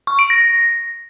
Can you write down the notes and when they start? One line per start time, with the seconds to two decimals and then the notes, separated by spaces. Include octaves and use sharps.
0.07 C#6
0.19 D7
0.30 A#6